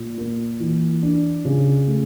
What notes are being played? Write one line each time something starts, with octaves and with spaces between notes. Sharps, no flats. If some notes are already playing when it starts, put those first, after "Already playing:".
Already playing: A#2
A#3
E3
D4
C#3
A3